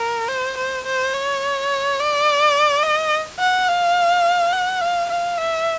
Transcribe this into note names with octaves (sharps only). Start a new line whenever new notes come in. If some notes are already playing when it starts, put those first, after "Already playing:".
Already playing: A#4
C5
C5
C5
C#5
D5
D#5
F#5
F5
F#5
F5
F5
E5